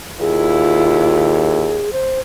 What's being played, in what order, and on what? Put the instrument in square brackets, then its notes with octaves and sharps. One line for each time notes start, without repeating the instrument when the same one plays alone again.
[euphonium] D#2 [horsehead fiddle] E4 F4 [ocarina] G#4
[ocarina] C5